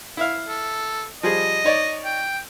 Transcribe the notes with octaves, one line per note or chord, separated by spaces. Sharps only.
E4 E5 F5
A4
F3 G3 G#4 D#5
D#4 C#5 D5
G5